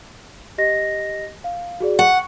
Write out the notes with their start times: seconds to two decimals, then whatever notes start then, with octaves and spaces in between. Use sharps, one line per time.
0.58 G4 D#5 A#6
1.44 F5
1.80 F#4 G#4 D5
1.99 F#5 C#6